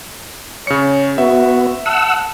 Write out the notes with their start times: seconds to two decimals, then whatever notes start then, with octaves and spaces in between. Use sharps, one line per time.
0.67 C#3 C#5 C#7
1.18 B3 F#4 E5
1.86 F#5 A5 E6